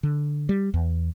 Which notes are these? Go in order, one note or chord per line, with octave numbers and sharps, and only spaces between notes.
D3
G3
E2